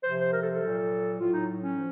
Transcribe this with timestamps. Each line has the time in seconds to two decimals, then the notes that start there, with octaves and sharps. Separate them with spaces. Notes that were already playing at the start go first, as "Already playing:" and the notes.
0.04 C3 F3 C5
0.18 C5
0.33 A#4
0.43 A4
0.53 A4
0.62 A#2 F#3
1.19 A2 F#3 F4
1.33 D#4
1.63 C#4
1.77 F3